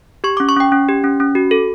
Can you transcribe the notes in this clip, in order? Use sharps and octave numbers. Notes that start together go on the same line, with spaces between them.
G4 C#6
C#4 D6
C#6
C#4 G5
C#4
G4
C#4
C#4
F#4
A4